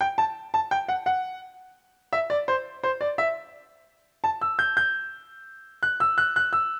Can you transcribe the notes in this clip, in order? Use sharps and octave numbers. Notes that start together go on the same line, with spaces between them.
G5
A5
A5
G5
F#5
F#5
E5
D5
C5
C5
D5
E5
A5
E6
G6
G6
F#6
E6
F#6
F#6
E6